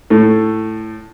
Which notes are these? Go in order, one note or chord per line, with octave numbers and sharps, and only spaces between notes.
A2 A3